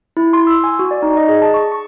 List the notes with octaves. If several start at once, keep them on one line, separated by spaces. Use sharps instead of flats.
E4
C6
E6
G#5
F#4
D5
D#4
D#5
G#4
A5
C#6
C#6